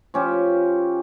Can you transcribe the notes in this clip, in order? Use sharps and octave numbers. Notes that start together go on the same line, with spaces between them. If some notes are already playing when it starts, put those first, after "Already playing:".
F3 C#4 G4